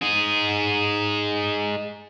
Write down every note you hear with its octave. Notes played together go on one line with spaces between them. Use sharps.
D#4 G#4